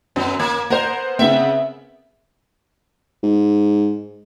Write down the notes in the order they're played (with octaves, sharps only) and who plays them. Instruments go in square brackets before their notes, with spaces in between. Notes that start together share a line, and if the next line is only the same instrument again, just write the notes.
[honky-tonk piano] F#2 [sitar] B3
[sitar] A#3 [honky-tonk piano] G#6
[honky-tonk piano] B3 C5 [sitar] A#4
[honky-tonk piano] C#3 B3 C4 [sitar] E5
[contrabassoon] G#2